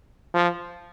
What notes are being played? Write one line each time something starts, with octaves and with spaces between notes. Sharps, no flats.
F3